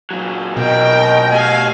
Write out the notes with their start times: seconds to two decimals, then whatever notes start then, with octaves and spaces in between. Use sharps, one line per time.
0.11 A#2 F#3
0.57 B2 A#4 D#5 G5
1.32 A3 G4 F5 G#5